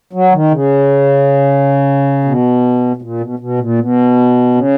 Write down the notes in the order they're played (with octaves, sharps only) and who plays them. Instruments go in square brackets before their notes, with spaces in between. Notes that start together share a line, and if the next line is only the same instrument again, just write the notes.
[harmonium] F#3
D#3
C#3
B2
B2
A#2
B2
B2
A#2
B2
C#3